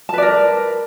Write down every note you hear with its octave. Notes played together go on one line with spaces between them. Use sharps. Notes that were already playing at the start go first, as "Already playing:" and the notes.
A#4 B4 D5 A5